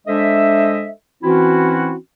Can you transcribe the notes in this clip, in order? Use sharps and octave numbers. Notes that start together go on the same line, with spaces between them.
G#3 D4 A4 C5 D#5 E5
E3 C4 C#4 E4 F#4